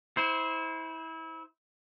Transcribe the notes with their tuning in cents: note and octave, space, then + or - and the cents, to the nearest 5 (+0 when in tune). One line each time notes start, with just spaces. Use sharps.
E4 -25 C5 +0